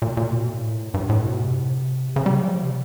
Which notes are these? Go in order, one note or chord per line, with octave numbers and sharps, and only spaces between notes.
A#2
A#2
B2
A2
G2
A2
B2
C3
C#3
G3
F#3
F3
C3